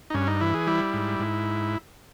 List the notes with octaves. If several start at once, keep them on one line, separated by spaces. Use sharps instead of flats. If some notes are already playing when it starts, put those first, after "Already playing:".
D#4
G2 C#4
D#4
E3 E4
G#4
G3 E4
G#2
G#2